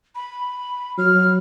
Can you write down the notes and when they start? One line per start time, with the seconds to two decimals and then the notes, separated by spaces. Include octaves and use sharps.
0.15 B5
0.98 F#3 F6